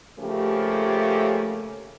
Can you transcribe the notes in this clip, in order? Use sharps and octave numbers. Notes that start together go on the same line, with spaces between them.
C#3 F3 A3 A#3 C#4 G4